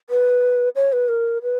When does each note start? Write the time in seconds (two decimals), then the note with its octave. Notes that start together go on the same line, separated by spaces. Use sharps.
0.10 B4
0.76 C#5
0.93 B4
1.09 A#4
1.42 B4